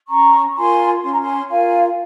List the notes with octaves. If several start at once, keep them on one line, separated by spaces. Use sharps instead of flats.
C#4 A#5 C#6
F4 A#4 G#5 C6
C#4 C6
A#5
G#5 C6
F4 A#4 F5 G#5